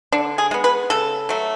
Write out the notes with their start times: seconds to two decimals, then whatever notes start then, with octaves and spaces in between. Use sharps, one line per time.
0.12 D3 D4
0.38 G#4
0.51 G#3 B3
0.64 B4
0.90 C#3 A4
1.29 F#3 A3